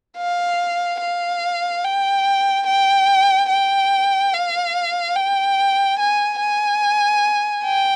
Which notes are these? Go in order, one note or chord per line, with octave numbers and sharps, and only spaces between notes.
F5
F5
G5
G5
G5
F5
G5
G#5
G#5
G5